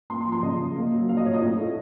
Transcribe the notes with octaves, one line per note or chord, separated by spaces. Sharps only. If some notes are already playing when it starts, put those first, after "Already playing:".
A#3 C6
C6
F3
C6
C#3 D#5
C#3
A#3
F#3
A#2 F5
D#5
A#2 C#5
D#5
A2
A3